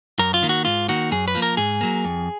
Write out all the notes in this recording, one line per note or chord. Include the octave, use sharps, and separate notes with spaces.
F#2 A#4
F4
D#3 A#3
F#4
G#2 F4
D#3 A#3 F#4
F#2 G#4
B4
F3 A#3
A#4
G#2 G#4
F#3 A#3
F2